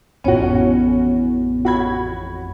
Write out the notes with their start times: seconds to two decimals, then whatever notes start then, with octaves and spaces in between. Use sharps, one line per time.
0.24 A1 F2 A2 B3 C#4 F#4 C#5
1.65 F#4 B5 G#6